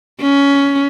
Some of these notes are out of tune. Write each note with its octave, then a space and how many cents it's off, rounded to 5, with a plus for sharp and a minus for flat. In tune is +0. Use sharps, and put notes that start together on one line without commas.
C#4 +15